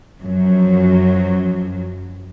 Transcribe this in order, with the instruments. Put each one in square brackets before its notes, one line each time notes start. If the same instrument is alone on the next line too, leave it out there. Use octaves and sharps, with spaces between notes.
[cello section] F#2 F3 F#3